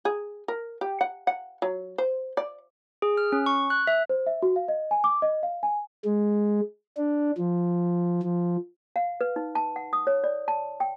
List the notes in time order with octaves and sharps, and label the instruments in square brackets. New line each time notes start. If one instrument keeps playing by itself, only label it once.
[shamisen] G#4
A#4
G4
F#5
F#5
F#3
C5
D5
[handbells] G#4
F6
C#4
C#6
F#6
E5
[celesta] C5
E5
F#4
F5
D#5
G#5
D6
D#5
F5
G#5
[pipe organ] G#3
D4
F3
F3
[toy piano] F5
B4
D#4
A5
F#5
D#6
C#5
D5
A5
G5